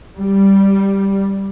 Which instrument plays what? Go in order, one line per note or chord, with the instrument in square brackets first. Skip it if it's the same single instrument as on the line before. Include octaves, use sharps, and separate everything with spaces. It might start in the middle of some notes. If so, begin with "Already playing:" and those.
[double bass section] G3